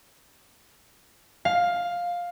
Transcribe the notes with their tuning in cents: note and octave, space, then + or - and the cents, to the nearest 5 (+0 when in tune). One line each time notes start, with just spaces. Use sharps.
F5 +10